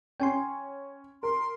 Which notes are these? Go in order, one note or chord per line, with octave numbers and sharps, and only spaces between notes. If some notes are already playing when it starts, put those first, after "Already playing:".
C#4 G5 G#5 C6
A#4 C6